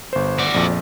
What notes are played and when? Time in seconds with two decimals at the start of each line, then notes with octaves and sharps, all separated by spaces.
0.13 G1 C5
0.39 F#4 D5
0.54 A#1 F2